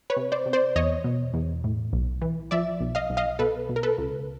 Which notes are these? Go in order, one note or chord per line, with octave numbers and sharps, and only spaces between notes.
B4 C#5
C3
C5 D5
C3
C5 D5
E2 C#5 D#5
B2
E2
A2
B1
E3
F3 D5 E5
B1
D#5 F5
B1
D#5 F5
B2 A4 B4
B2
A#4
A4 B4
C#2